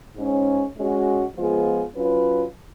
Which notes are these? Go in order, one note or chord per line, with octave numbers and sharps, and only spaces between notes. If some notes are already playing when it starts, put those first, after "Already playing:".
G#2 G#3 C#4
G#3 C#4 F#4
F3 G#3 B3 F4 G#4
F#3 C#4 F4 B4